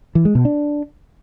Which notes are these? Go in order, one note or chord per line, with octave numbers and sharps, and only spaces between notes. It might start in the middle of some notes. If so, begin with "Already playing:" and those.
E3
G#3
B2
D4